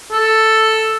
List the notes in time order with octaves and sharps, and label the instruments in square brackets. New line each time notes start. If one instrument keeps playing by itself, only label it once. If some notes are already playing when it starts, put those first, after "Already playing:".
[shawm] A4